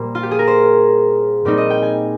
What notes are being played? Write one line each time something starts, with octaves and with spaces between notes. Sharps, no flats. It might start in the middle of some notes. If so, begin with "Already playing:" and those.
Already playing: A#2 G3 A#3 C5
F4
G4
G#4
A#4
C5
A#2 G3 C4 D#4 D5
D#5
G5
G#5